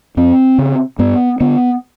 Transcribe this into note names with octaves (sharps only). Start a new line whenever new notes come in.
F2 C4
C#3
G2 B3
D3 B3